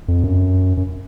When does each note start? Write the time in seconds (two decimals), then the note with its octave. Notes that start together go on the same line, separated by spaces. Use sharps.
0.08 F2
0.24 F#2
0.77 F#2